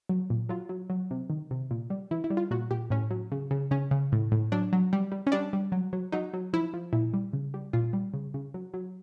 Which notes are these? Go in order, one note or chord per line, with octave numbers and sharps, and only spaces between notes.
F#3
A#2
F#3 F4
F#3
F#3
C3
D#3
C3
A#2
G3
E3 E4
E4
G3
F4
A#2 F#4
A#2 G4
A2 C#4
F#3
C#3
C#3
C#3 C#4
C#3
A2
A2
F#3 D4
F#3
G3
G3
C#4
G3 D4
G3
F#3
F#3
F#3 D#4
F#3
F3 E4
F3
A#2 E4
G3
C#3
G3
A#2 F4
G3
C#3
C#3
F#3
F#3